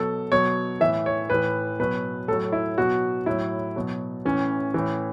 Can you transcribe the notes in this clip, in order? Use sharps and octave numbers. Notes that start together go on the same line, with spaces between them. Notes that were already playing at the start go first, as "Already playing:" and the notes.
Already playing: B2 F#3 A4
B2 F#3 C#5
A2 E3 E5
C#5
A2 E3 B4
B2 F#3 B4
A2 F#3 A4
E4
B2 F#3 F#4
A2 F#3 E4
B2 F#3
A2 E3 C#4
A2 E3